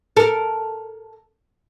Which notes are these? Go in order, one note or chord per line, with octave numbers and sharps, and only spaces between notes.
A4 A#4